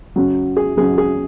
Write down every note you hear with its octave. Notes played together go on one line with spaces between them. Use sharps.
F#2 C#3 F#3
G#4
F#2 C#3 F#3 G#4
G#4